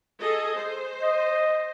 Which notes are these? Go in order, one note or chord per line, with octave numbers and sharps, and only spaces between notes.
G#4 A4 D#5
C5
D#5